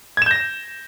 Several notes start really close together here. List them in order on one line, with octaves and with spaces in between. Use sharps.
G#6 E7 G6 A#6